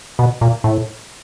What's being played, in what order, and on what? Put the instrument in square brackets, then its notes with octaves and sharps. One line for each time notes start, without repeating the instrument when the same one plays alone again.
[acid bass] B2
A#2
A2